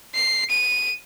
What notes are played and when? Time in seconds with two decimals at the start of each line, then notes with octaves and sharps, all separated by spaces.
0.15 C7
0.50 D#7